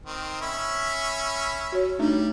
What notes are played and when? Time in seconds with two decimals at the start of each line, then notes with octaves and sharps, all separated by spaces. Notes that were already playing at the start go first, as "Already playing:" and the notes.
0.06 D#3 C4
0.41 C#4 E5 B5
1.72 F#4 C#5
1.99 G3 A3 D4 D#4